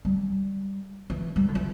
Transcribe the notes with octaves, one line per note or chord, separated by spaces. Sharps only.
G3
E3
G3
D3
E3